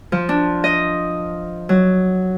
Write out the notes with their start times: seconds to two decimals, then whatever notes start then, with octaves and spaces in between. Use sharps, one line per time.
0.12 F3
0.29 D4
0.64 D#5
1.69 F#3